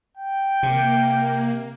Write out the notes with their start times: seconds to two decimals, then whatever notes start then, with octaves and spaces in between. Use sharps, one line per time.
0.17 G5
0.63 C3 A#3